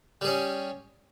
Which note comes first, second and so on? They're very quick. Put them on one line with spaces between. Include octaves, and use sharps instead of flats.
G3 G#4 C#4